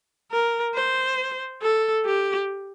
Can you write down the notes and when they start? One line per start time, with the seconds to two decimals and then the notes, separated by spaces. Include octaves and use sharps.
0.32 A#4
0.75 C5
1.62 A4
2.05 G4